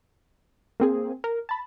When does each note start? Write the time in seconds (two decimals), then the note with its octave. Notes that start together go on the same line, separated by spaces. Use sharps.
0.80 A#3 C4 G#4
1.24 A#4
1.49 A5 B5